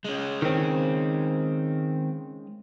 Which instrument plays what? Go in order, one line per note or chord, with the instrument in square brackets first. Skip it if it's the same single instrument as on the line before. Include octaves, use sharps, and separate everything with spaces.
[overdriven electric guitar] G#3 C#4
[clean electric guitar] D#3 C4